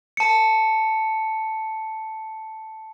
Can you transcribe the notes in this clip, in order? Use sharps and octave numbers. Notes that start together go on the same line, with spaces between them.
A5 C#7